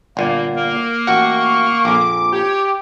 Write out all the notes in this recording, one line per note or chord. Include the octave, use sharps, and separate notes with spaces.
G1 A#2 A#3
A#3 A#4
A1 F#4 F#5 C#6
A#1 F2 D6
G4 C#5